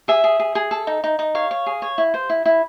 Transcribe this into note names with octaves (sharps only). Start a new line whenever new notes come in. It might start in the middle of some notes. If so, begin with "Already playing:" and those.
G#4 E5
G#4
G#4
G#4
A4
D#4
D#4
D#4
C#5 F5
C#5
G#4
C#5
E4
C5
E4
E4